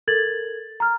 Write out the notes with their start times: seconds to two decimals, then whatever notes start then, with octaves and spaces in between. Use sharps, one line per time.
0.08 A4 A#4 G#6 A6 F#7
0.80 A#5 F6